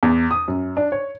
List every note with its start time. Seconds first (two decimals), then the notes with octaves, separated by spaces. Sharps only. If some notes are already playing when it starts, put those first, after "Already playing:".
0.03 E2
0.31 D#6
0.48 F#2
0.77 D4
0.92 C#5